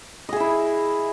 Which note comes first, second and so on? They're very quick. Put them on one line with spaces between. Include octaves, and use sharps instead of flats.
D#5 G#4 E5 E4